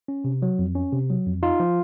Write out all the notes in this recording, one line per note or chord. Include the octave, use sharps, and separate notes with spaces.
C#4
C3
F#3
F2
C#4
C3
F#3
F2
D#4 F4
F3